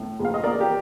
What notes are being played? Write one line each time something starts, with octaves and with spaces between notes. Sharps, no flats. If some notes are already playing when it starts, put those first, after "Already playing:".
Already playing: A2
A#1
F5
D#5
A#3 A#4 D5
G4 A#4